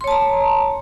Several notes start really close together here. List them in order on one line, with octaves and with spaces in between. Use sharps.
C6 C#5 A5 A#5